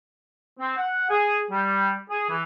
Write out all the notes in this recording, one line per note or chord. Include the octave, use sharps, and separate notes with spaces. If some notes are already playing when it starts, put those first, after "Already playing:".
C4
F#5
G#4
G3
G#4
E3